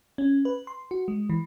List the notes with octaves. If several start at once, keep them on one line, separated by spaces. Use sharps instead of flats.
C#4
B4
C6
F#4
G#3
E3